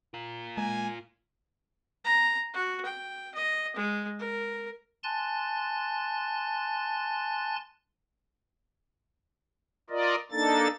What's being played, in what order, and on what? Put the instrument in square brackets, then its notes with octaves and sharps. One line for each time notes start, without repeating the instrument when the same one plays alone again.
[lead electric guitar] F4 A#4
[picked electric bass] G#3 A#3 [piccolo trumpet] G#5
[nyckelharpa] A#5
F#4
G5
D#5
G#3
A#4
[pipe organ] G#5 A5 C6 F#6 A6
F4 A#4 D5 D#5
A#3 D4 D#4 A4 A6